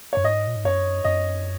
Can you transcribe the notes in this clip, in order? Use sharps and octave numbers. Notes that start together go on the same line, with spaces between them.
F#2 C#5
G#2 D#5
A#2
G#2
F#2 C#5
F#2 D#5